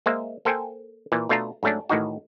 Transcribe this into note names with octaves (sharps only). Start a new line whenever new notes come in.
G#3 A#3 C5 E5
A#3 A4 C5 G5 G#5
A#2 E3
B2 A3 D4 F4 A5 A#5
G#2 F#3 A3 C#4 D4
A1 A2 D#3 D#4 F#4